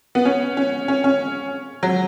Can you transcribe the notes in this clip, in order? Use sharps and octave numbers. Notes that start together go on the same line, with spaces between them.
B3
C#4
C#4
C#4
C#4
F#3